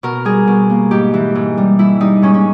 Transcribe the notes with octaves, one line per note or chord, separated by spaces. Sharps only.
B2 A#4
G3 G#4
B2
A#3
G#2 G4
E3
G#2
G3
G#2 E4
G3 D#4
G#2 C#4
C#4